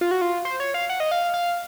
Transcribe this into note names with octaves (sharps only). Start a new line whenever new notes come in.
F4
F#4
F4
C5
C#5
F5
F#5
D#5
F5
F5